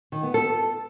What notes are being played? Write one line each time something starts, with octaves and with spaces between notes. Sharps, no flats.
D#3
B3
A4